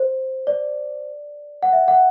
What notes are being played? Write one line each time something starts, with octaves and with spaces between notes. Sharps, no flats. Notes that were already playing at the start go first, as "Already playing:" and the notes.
Already playing: C5
D5
F#5
E5
F#5